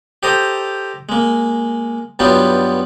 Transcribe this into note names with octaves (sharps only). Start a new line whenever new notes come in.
G4 A4 C5 D#5 A#5
G#3 A#3
G2 F#3 G3 B3 D#4 F4